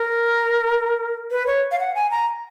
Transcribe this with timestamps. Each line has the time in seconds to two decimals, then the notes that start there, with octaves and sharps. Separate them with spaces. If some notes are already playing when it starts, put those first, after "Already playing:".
Already playing: A#4
1.31 B4
1.47 C#5
1.72 F5
1.80 F#5
1.95 G#5
2.11 A#5